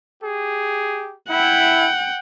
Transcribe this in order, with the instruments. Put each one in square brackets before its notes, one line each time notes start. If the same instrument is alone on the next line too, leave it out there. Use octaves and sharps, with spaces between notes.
[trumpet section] G4 G#4
[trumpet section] E4 [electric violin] F#5 G5